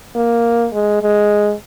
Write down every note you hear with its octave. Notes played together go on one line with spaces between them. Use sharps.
A#3
G#3
G#3